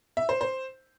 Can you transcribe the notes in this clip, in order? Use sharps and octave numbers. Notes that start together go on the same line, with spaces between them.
E5
C5
C5